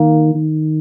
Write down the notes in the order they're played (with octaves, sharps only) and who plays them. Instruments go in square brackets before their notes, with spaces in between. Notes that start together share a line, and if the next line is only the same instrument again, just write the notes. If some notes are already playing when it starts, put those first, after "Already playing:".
Already playing: [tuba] D#3 [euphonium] A#3
[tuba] D#3